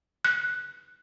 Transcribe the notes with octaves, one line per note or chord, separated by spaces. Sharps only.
F#6